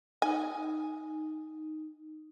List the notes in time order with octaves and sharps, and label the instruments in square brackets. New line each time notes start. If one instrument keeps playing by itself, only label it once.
[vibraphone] D#4 [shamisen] G#5